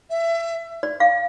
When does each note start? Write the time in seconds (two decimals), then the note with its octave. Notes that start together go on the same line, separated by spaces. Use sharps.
0.10 E5
0.83 D5
1.00 F5